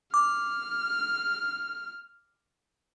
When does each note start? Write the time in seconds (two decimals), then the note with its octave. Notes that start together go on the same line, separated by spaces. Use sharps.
0.14 D6 F6